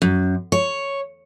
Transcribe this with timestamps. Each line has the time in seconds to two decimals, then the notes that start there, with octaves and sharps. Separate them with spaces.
0.02 F#2
0.52 C#5